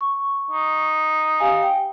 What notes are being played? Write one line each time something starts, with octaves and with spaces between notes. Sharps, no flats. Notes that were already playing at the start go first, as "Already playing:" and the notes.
C#6
D#4
G4 F5 G#5
G5